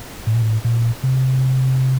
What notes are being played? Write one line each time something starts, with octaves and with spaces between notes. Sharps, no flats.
A2
A#2
A2
A#2
C3